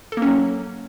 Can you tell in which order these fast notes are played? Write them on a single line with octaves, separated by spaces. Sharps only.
A4 A#3 C#4 F#3